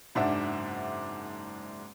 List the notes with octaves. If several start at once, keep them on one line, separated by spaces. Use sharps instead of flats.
F#1 G#2 D4 E5 F#5 D6